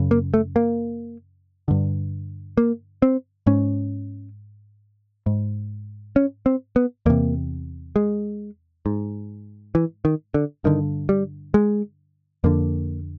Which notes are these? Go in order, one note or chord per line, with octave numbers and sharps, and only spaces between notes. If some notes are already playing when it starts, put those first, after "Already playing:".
Already playing: F#2 C#3
A#3
A3
A#3
G2 D3
A#3
C4
G#2 C#4
G#2
C#4
C4
B3
E2 C3 A#3
G#3
G#2
E3
D#3
D3
G2 D3 D#3
G3
G#3
F2 D3 A#3